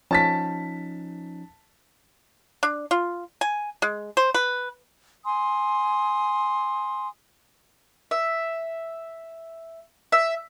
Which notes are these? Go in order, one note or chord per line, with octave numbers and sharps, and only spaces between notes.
F3 C#4 D#4 A5 A6 B6
D4
F4
G#5
G#3
C5
B4
G#5 C6 D#6
E5
E5